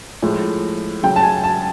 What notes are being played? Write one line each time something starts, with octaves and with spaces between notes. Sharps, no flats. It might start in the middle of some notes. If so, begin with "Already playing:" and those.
A2 F3 G#3
C#3 F#3 G5
A5
G#5
A5